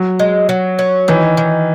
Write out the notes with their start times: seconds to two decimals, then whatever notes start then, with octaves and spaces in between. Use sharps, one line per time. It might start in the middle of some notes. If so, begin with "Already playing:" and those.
Already playing: F#3
0.20 G#3
0.49 F#3
0.79 C#4
1.08 D#3 E3
1.37 D#3